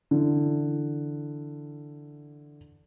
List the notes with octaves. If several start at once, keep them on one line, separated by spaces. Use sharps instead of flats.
D3 E3